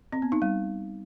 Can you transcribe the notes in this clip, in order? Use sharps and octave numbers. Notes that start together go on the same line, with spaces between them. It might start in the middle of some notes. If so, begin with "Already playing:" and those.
C4
B3
D#4
G3